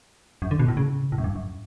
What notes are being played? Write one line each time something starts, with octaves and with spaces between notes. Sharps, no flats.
F#2
D3
B2
A2
C#3
A2
F#2
G2
F#2